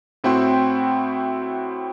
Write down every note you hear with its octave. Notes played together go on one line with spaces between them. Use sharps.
A2 C4 E4 F#4 G5 C6